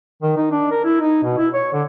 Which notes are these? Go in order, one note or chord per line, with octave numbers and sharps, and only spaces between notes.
D#3
D#4
D4
A#4
E4
D#4
B2
E4
C#5
D3